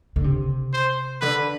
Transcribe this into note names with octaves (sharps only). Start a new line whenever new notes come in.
D3
C3
C5
D3 B4